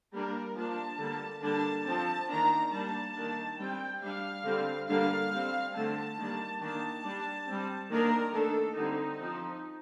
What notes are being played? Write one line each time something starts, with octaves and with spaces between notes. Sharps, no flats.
G3 A#3 D4 A#4
F3 A#3 D4 A5
D3 G3 A#3
D3 G3 A#3 D4 A5
F3 C4 A5
D#3 A#3 D4 A#5
G3 A#3 D4 A5
D#3 A#3 D4
G3 C4 G5
G3 D4 F5
D3 G3 C4
D3 G3 A#3 D4 F5
G3 C4
D3 A3 C4 A5
D#3 G3 A#3 D4
D#3 A#3 D4 A5
G3 D4
G3 C4
D#3 A#3 D4 A#4
D#3 A3 D4 A4
D3 G3 C4 D#4
F3 C4